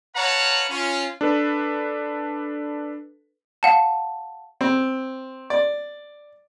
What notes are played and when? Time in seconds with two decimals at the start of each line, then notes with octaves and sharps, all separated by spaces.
0.16 B4 C#5 F5 F#5 A5 A#5
0.70 C#4 F4
1.21 D4 A4 B4
3.63 F5 F#5 A5
4.61 C4
5.50 D5